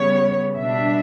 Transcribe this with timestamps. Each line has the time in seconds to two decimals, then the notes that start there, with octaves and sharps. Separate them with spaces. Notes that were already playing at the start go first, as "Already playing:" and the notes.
Already playing: C#3 G3 B3 C#5
0.58 B2 G3 D4 E5